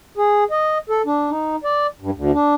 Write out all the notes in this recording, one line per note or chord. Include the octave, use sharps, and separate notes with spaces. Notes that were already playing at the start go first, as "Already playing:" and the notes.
G#4
D#5
A4
D4
D#4
D5
G2
D2
D4